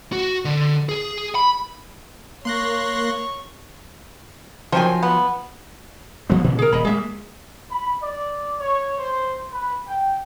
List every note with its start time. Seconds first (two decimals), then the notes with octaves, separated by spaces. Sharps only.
0.13 F#4
0.45 D3
0.89 G#4
1.35 B5
2.45 A#3 C#5 C6 C#6 F#6 A#6
4.72 D#3 F3 F#3 C4 G#5
5.03 B3
6.30 F3 G#3 B3
6.44 A#2 C#3 E3
6.59 G#4 A#4
6.72 D#1 D#5 B5
6.85 G#3 A#3 G#4 E5
7.69 B5
8.01 D5
8.58 C#5
8.97 C5
9.52 B4
9.86 G5